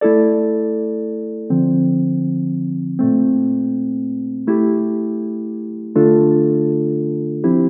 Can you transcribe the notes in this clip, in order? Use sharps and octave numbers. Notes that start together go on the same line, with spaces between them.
A3 E4 A4 D5
D3 F3 C4
A#2 A3 C4
A3 E4 G4
D3 A3 D4 F4 A4
F3 C4 E4 G4